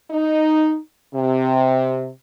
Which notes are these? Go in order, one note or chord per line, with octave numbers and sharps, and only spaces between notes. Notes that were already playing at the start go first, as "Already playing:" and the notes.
D#4
C3